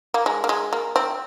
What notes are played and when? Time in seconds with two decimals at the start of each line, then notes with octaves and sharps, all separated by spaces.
0.14 A#3
0.26 G#3
0.44 A#3
0.49 G#3
0.73 A#3
0.96 C4